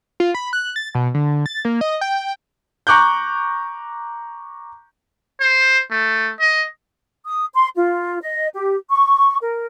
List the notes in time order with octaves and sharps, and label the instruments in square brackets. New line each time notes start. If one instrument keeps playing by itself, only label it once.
[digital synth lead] F4
B5
F#6
A6
B2
D3
A6
A#3
D#5
G5
[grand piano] A#5 C#6 D6 F#6 G6
[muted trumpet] C5
A3
D#5
[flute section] D#6
C6
F4
D#5
G4
C#6
A#4